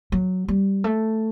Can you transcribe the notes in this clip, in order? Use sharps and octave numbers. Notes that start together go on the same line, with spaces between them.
F#3
G3
A3